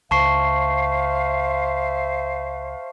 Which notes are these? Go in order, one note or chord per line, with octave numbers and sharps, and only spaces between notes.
C#2 C5 E5 F5 A5 C#6 C7